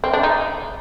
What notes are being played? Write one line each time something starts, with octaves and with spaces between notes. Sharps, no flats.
C4
D4
D#4